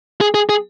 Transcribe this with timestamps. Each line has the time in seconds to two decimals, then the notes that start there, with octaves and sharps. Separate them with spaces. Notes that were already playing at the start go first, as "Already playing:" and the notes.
0.21 G#4
0.34 G#4
0.49 G#4